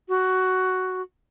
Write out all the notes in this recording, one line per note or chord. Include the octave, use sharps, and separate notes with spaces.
F#4